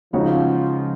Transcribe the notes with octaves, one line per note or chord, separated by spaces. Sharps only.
C#3 F3 G#3 D#4 F#4 C#5